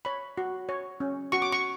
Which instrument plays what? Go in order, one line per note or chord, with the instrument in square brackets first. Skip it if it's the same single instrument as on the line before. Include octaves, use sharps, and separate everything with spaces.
[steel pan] C#5 B5
F#4
C#5
C#4
F#4 C#6
D6
C#6